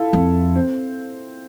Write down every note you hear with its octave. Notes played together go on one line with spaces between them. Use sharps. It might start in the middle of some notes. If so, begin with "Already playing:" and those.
Already playing: E4 F4 A4
F2
C4